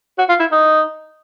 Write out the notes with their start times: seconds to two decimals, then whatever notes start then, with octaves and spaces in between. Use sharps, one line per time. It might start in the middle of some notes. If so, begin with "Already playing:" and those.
0.19 F#4
0.29 F4
0.40 E4
0.52 D#4